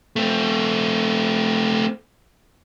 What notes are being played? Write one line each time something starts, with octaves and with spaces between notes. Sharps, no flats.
A3 C4